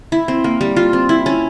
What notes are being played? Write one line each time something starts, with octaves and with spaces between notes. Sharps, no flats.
E4
C4
A#3
G3
F4
C4
E4
C#4